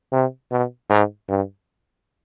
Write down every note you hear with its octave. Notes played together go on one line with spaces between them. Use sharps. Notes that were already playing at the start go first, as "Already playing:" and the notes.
C3
B2
G#2
G2